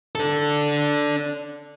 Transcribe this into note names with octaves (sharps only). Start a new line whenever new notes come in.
D4 A4